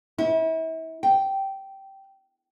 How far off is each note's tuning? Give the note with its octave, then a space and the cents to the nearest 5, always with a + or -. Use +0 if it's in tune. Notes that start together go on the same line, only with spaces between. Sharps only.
E4 -35
G5 -10